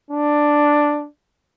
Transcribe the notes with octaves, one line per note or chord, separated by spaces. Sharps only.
D4